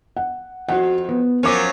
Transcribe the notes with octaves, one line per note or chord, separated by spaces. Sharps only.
F#5
F2 F#4 F#5
B3
F3 F#3 C#4 A#4 D6